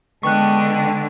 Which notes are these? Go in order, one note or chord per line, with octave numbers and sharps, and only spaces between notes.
D3 G#3 B3 D#5 G5 A5 C#6 F#6